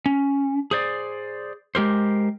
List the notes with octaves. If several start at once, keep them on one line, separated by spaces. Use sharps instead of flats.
C#4
G#4 C5 D5
G#3 G4 A#4 C5